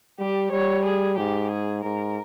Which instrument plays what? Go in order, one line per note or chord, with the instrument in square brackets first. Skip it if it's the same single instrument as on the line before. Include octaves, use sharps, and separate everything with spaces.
[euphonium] G3 [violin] G4
[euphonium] G3 [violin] C#5
[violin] G#4
[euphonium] G#2 [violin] G4
[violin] G#4
[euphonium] G#2 [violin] A#4